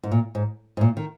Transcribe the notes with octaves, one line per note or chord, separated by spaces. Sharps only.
G#2
A#2
G#2
G#2
A#2
D#3